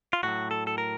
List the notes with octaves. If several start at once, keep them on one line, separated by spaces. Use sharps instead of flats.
F4
A2 F#3 F#4
A4
A4
A#4